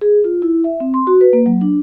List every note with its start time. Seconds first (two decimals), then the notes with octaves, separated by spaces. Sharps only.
0.01 G#4
0.24 F4
0.42 E4
0.64 E5
0.80 C4
0.94 C6
1.07 F#4
1.21 B4
1.33 A#3
1.46 F#3
1.61 D4